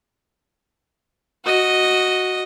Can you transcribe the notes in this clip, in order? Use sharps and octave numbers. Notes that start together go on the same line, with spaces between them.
F#4 D#5